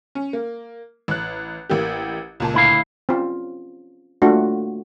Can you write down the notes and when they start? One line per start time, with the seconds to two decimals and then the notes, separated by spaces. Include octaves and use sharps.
0.15 C#4
0.33 A#3
1.08 A1 F#6
1.70 A1 A#3 G4
2.40 C#2 A#2 A5
2.54 D2 E4 F5
3.09 C4 C#4 F4
4.22 A3 A#3 D4 F4 F#4